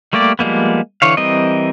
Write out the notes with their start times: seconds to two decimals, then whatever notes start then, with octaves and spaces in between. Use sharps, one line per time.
0.13 G3 A3 A#3 G4 D5
0.39 F3 G3 G#3 A#3 B3
1.02 D3 E3 C#5 F5
1.17 E3 G3 C4 A#4 D#5